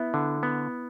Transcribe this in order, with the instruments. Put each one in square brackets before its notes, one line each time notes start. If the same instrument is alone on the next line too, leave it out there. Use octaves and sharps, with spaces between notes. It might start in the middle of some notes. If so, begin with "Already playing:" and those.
Already playing: [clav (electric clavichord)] B3 [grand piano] E4
[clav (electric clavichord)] D3
B3